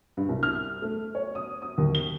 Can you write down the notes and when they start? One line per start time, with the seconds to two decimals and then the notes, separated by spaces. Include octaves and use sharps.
0.17 G2
0.29 C2
0.43 F6
0.82 A3
1.15 C#5
1.35 D#6
1.62 D#6
1.78 D#2
1.95 G7